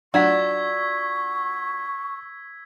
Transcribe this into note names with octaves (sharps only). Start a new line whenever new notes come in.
F#3 D4 F4 F#5 C#6 E6 G#6 B6